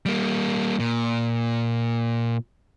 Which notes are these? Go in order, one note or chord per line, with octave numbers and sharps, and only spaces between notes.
G3 A#3
A#2